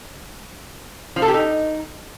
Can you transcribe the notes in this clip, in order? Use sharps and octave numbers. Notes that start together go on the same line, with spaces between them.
F3
A4
G4
D#4